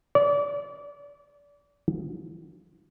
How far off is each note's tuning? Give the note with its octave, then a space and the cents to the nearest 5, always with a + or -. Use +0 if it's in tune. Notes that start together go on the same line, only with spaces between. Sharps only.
D5 -30